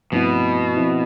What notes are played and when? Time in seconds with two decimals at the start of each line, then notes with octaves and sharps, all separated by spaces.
0.12 G2 B2 F3 A3 C4 E4
0.77 F3 C4 E4